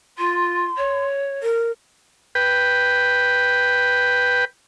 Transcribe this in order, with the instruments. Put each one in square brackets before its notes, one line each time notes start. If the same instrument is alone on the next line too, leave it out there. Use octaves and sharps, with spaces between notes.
[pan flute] F4 [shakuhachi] C6
[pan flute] C#5
[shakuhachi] A#4
[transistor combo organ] B4 G5